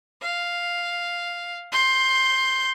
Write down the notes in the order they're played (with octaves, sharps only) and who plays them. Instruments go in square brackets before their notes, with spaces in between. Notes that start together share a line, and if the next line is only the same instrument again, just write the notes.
[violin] F5
C6 G6